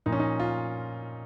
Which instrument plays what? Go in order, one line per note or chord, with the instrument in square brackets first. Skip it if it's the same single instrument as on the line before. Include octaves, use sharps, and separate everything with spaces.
[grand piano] A#2 F3 D#4
C#4
D#4
F4